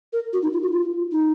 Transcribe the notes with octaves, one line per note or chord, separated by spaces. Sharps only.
A#4
F#4
D#4
F4
F#4
F4
D#4